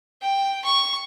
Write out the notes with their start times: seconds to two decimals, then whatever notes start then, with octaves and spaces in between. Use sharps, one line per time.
0.22 G5
0.64 C#6